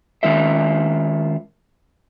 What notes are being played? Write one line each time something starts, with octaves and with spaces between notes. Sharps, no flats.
D#3 G#3 C#4 F4 A#4 E5